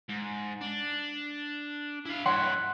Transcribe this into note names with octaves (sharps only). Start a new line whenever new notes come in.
G#2
D4
E4 F5
G2 E4 C#5 F#5 C6